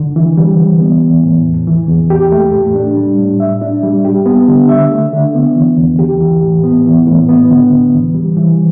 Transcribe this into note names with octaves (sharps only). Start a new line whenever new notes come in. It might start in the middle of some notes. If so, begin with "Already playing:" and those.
Already playing: D3
E3
G3
E3
B3
E3
A2
E2
E3
E2
G4
A3
A2
D4
G3
A2
E5
D4
G3
G4
B3
D3
E5
A3
D3
B3
E3
E2
G4
E3
A2
B3
E3
A2
B3
D3
D2
E3
G3
E3